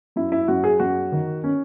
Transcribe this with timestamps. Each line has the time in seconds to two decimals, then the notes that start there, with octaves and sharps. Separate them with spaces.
0.16 F#2 E4
0.32 E4
0.48 F#2 F#4
0.64 G#4
0.80 F#2 F#4
1.12 D#3
1.44 C#4